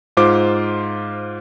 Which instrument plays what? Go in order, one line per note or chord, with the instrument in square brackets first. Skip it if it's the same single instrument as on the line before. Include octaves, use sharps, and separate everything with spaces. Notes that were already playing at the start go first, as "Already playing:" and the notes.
[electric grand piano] G#2 F4 C5 D6